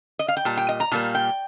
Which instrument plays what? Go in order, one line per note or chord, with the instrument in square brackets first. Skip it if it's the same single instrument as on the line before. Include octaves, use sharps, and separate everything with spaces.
[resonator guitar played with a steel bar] D#5
F5
G5
A#2 G3 A5
G5
D#5
A#5
A#2 G3 A#3 A5
G5